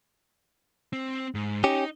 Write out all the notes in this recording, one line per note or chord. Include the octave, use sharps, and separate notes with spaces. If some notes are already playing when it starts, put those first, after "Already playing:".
C4
G#2
C#4 D#4 G4 D#5